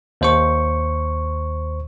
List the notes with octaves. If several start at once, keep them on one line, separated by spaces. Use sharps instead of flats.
D#2 C5 C#6